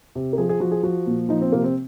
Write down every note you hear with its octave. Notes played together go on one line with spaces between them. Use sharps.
C3
A#4
F3 G#4
G#4
F3 F#4
G#4
F3 F#4
A#2
F3 D#4
C4
C3 A#3
C4